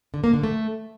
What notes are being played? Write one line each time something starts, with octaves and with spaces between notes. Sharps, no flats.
D3
A#3
D3
A3